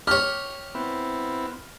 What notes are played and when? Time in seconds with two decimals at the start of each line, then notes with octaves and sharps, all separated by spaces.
0.07 G4 C#5 F6
0.75 B3 C4 E4